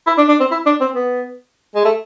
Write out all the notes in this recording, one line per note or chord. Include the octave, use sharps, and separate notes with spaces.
E4
D4
D4
C4
E4
D4
C4
B3
G#3
A3